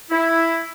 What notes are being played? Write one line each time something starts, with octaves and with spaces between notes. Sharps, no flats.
E4